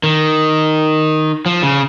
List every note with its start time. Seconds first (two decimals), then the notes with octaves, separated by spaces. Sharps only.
0.03 D#3
1.46 F3
1.63 C#3